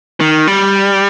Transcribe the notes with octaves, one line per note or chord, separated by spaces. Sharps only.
D#3
G3